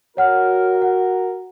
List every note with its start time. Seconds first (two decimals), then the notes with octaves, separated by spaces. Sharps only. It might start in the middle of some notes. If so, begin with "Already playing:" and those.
0.17 F#4 A#4 C#5 F#5 F6
0.82 F#5